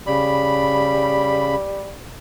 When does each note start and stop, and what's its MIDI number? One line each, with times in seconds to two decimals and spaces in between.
0.07 1.55 49
0.07 1.93 55
0.07 1.55 83